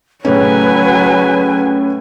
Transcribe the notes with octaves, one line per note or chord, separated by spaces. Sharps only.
A2 C#3 F#3 C#4 B4 G#5